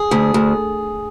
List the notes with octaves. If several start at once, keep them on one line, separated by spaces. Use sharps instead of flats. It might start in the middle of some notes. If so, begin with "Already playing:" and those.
Already playing: G#4
D2
D2